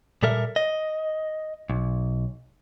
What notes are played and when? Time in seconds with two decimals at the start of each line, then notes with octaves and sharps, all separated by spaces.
0.23 A#2 G3 A4 A#4 E5
0.56 D#5
1.70 B1